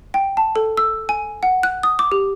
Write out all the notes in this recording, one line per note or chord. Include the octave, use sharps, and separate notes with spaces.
G5
A5
A4
E6
G#5
F#5
F#6
D#6
D6
G4